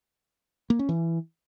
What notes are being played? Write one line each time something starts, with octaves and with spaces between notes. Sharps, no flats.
A#3
C#4
E3